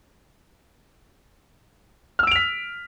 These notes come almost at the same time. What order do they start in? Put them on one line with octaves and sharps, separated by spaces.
F6 E6 D7 F7 B6